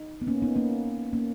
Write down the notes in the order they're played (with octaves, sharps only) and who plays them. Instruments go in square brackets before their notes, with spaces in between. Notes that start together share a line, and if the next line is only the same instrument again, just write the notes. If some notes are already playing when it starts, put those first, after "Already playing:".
Already playing: [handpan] D#4
B3
A#3 C#4
B3 D#4
A#3 C#4
A#3 C#4